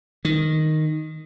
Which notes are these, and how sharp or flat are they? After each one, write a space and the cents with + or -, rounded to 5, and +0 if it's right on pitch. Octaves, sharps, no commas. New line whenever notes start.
D#3 -5